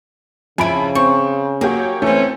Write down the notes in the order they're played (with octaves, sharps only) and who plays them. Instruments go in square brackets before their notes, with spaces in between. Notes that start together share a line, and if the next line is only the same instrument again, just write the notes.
[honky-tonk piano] F2 B5 D7 [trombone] C#3 [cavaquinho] E4 G#5
[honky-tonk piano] C4 [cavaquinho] C#6
[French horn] F#3 [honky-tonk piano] A#3 G4 C#5 [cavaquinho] G#4
[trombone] E3 [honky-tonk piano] A3 C4 [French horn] C#4